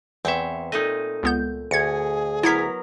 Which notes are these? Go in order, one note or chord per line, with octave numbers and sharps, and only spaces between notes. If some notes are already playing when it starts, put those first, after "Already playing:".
E2 C4 C#5 E5
A#2 A3 D#4 D#5
C#2 B3 G6
D2 G#4 G#6 C#7
F#3 B3 E4 A#4 G#6 B6